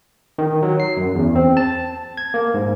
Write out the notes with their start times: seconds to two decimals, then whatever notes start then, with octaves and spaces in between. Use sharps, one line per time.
0.38 D#3
0.62 F#3
0.80 C7
0.97 F#2
1.15 E2
1.35 C4
1.57 A5
2.17 G#6
2.34 A#3
2.54 G#2